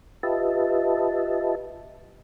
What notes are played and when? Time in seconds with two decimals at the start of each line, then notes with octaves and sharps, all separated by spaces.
0.23 F4 G4 B4 D#5 E5 A5